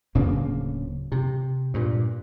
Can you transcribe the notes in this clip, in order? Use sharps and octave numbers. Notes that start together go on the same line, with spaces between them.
D1 D2 C#3 A#3
C3
G2 A#2